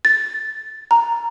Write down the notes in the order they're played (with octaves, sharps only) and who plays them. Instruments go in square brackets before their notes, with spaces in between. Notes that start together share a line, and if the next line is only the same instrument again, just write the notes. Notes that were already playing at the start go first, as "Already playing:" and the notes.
[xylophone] A6
A#5